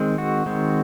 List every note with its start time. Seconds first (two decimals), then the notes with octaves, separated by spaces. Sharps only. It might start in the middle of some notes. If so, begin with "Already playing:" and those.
Already playing: D#3 G#3 C4
0.18 F#4
0.46 D#3 G#3 C4